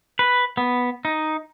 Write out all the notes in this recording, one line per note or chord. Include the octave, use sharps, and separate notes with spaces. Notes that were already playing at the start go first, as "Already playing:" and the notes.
B4
B3
D#4